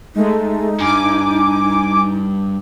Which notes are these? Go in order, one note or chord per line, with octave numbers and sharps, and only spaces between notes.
G#3 A3 D#4
G2 G#5 D6